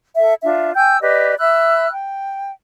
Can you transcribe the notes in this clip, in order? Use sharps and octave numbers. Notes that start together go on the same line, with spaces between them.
A4 E5
D4 F4 E5
G5 G#5 E6 G6
G4 B4 D5 D#5
E5 B5 E6 F#6
G5